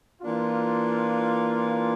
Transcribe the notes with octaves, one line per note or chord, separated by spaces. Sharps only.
E3 A#3 D4 F4